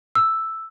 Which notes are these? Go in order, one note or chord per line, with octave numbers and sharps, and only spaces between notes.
E6